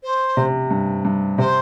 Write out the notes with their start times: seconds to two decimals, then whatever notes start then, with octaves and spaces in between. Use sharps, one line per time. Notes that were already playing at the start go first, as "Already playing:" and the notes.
0.03 C5
0.37 C3
0.71 G2
1.05 G2
1.38 C3 C5